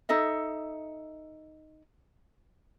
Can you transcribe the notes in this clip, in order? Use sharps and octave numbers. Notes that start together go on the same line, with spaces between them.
D#4 A4 D#5 E5